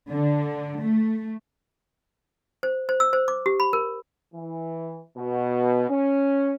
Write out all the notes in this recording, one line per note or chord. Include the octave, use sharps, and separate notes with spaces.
D3
A3
C5
C5
E6
C5
D6
G4
B5
A#4
E3
B2
C#4